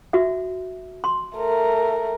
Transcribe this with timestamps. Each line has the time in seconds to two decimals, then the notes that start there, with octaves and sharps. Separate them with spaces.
0.13 F#4 E5
1.04 C6
1.37 A3 A#4